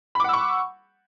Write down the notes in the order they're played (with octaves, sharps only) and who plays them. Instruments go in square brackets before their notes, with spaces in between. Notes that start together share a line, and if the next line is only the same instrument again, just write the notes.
[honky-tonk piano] B5
D6
F#5
E6
C#6